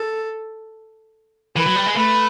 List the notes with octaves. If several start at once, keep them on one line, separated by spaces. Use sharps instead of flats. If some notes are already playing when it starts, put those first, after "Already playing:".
Already playing: A4
E3 B4
F#3
G3
G#3
A3 B4